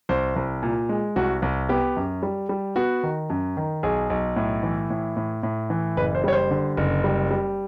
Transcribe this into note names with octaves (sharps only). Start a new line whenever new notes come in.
C2 C5
C2
A#2
G#3
C2 F#4
C2
B3 G4
F#2
G3
G3
B3 F#4
D#3
F#2
D#3
B1 G#4
B1
A2
E3
A2
A2
A2
E3
F#1 B4
C5
G3 C#5
C5
D3
F#1
G3
G3